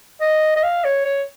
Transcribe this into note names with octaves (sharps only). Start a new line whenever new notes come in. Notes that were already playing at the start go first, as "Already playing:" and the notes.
D#5
D#5
F5
C#5
C#5